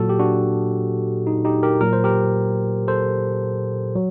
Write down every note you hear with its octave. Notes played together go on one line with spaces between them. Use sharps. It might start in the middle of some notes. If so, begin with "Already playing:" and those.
Already playing: A#2 F#3 F#4 A4
G4
D4 F#4
D#4
D#4 G4
G4 A#4
A#2 F#3 A#4
C5
G4 A#4
A4 C5
F#3